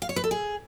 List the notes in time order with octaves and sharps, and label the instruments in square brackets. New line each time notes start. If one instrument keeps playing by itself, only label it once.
[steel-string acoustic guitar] F5
C#5
B4
A4
G#4